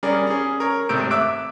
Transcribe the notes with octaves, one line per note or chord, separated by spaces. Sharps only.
G3 C#4 G#4 A#4 D5
C#4 G#4
A#4 C#5
G#1 C3 A3 E6 G6 D7
E5 D6 E6 F#6 D7